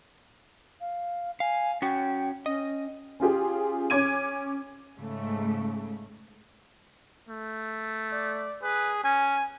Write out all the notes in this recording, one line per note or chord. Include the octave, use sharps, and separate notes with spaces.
F5
F5 G#5
C#4 F#4 C#5 G5
C#4 D#5
C#4 F4 G4 G#4
C#4 C#5 D6 G#6 D#7
G#2 C#3 A3
A3
D5
G#4 B4
C#4 G#5